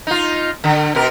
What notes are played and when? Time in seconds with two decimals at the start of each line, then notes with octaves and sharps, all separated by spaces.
0.07 D#4 F4
0.64 D3
0.95 B2 A#4